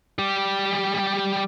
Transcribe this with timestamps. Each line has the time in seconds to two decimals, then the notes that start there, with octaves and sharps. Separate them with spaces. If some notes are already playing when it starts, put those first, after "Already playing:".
0.19 G3 G4